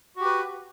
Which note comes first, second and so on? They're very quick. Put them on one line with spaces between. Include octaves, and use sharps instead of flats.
F#4 G4 B4